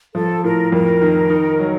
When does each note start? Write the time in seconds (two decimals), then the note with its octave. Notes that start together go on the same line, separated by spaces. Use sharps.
0.15 F3 A4
0.44 A2 A#4
0.72 F2 A#4
1.02 D#3
1.30 D#4
1.59 F#3